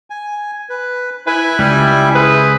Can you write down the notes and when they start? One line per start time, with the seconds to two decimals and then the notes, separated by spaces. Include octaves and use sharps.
0.10 G#5
0.70 B4
1.27 E4 B4 E5 G#5
1.59 C#2 G3
2.14 G#4 B4 C5